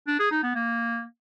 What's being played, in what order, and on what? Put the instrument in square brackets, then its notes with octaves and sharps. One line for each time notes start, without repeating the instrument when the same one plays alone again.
[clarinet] D4
G#4
D#4
B3
A#3